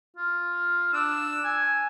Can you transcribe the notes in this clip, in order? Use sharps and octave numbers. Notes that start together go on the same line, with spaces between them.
F4
D4 E6
G#5